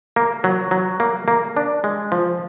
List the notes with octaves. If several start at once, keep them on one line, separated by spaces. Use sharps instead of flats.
A#3
F#3
F#3
A#3
A#3
D4
G#3
F3